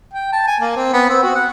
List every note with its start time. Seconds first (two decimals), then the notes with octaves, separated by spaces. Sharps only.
0.14 G5
0.32 A5
0.47 G#5
0.60 A#3
0.76 C4
0.93 B3
1.09 C4
1.23 F#4
1.35 F#5